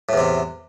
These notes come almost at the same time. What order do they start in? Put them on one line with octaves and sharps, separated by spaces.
A2 E2 C3